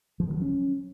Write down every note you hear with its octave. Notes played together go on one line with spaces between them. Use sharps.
F3
D#3
F#3
C#4